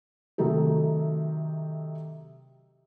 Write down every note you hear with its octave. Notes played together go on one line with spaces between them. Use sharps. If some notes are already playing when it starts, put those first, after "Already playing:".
C3 D#3 F#3 A3 D#4 A4